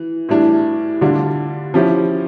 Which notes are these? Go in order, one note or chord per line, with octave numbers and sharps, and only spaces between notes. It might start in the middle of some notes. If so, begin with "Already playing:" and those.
Already playing: E3
A2 E3 G3 D4
D3 G3 D4 F4
F3 C#4 E4 G4